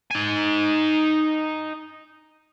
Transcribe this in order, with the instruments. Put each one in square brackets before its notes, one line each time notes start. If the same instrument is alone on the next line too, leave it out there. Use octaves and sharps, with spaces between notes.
[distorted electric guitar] D#4 G#5